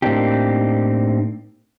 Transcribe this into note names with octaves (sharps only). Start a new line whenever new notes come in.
A2 A#3 C4 D4 D#4 G4